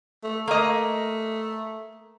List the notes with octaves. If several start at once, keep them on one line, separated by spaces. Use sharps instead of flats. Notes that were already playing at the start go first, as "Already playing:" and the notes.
A3
A3 A#3 D#5